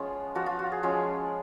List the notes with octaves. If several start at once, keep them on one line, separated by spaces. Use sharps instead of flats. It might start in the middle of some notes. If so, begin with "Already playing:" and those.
Already playing: F3 G#3 B3 C#4 F4
F3 B3 F4 F#4
F4
F#4
G#4
F3 G#3 C#4 F4